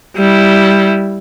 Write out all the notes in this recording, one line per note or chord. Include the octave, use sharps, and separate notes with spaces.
G3 E4